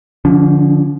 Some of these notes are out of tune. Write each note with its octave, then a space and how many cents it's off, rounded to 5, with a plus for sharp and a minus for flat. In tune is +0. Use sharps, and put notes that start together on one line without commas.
D3 +0 F3 +0 C#4 +35